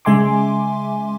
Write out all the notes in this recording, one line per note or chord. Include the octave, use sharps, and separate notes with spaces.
C#3 G#3 E5 G#5 C6 D6